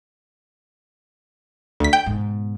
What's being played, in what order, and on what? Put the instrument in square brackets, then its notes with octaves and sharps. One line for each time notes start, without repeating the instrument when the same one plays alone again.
[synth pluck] D2 B6
G5
[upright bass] G#2 B2